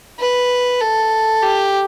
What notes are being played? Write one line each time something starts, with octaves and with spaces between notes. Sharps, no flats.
B4
A4
G4